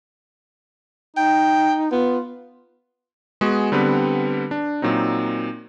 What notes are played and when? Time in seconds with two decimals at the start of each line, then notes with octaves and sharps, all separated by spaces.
1.17 D#4 G5
1.92 B3 F4
3.41 G#3 B3 F#4 G#4
3.72 D3 G3 B3 C4 B4
4.51 D4
4.82 A#2 F#3 C4 D#4